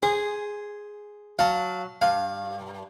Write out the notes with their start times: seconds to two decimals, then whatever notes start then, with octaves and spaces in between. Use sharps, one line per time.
0.03 G#4 C5
1.39 F#3 F5 A5
2.01 G2 F5